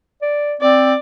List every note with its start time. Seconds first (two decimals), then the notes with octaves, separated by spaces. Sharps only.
0.22 D5
0.61 C4 D5